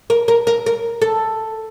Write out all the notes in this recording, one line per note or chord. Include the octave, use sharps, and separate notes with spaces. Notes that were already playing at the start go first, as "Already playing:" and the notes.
A#4
A#4
A#4
A#4
A4